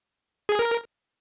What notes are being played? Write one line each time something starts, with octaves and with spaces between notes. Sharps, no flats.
G#4
A#4